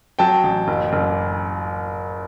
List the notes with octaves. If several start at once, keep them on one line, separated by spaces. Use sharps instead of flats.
F#3 G5 A5
A1
F#1
F#1